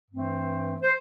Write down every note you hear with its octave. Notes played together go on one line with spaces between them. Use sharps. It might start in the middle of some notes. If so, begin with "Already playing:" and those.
G2 E3 A3 C4
C5